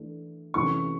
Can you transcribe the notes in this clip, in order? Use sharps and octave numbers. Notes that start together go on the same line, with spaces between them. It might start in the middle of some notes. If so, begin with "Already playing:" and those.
Already playing: E3 A3 D4
C3 E3 A3 C#4 C#6